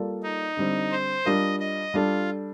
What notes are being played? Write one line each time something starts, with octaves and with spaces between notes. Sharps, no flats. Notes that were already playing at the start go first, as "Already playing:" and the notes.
Already playing: G3 A#3 F4 A4 D5
D#4
D3 G3 C4
C5
G3 D4 F4 A#4 D#5
D#5
G3 D4 F4 A4